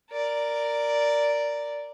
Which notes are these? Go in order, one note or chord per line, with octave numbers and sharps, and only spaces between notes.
A#4 D5